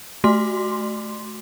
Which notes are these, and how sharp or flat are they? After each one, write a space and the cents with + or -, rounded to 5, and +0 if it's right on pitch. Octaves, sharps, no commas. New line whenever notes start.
A3 -25 F#4 +0 C6 +0